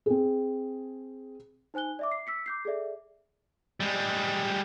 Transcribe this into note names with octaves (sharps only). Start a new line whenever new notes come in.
C4 G#4
D#4 C5 G#5 F#6 G7
D5 E5 D6
C7
E6 B6 C#7
D6 G6 C7
G#4 A4 D5 E5
G3 G#3